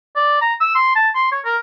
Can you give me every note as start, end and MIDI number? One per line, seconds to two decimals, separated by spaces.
0.16 0.41 74
0.41 0.53 82
0.60 0.71 88
0.75 0.93 84
0.95 1.10 81
1.15 1.28 84
1.32 1.40 73
1.45 1.57 70